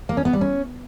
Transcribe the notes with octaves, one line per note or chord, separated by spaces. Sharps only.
A#3
C#4
B3
G3
C#4